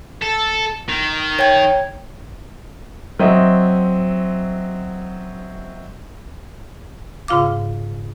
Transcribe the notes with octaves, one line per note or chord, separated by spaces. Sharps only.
A4
D#3
C#5 G5 G#6
F#3 C4 D#5 E5
G#2 C#3 F4 F5 D6